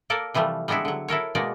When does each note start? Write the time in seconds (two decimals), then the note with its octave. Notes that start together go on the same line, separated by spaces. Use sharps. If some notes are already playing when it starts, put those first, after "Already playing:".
0.10 A#3 A4 A#4 D5
0.34 C3 E3 F3 G3 A3
0.68 G3 G#3 B3 D4 E4
0.85 D3 F#3
1.08 E4 A4 A#4 C#5
1.35 B2 G#3 A#3 F#4 D5